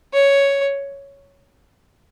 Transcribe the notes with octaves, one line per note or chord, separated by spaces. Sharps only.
C#5